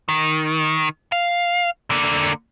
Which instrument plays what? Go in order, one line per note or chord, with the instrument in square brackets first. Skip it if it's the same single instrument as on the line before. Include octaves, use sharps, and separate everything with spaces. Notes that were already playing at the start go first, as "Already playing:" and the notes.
[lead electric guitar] D#3
F5
D3 A#3